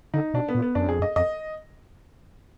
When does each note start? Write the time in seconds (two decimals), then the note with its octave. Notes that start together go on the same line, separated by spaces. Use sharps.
0.14 D3 D#4
0.34 B2 D4
0.48 B3
0.55 A#2
0.62 B3
0.75 F#2 D4
0.87 F2 G#4
1.00 F#2 D#5
1.16 F2 D#5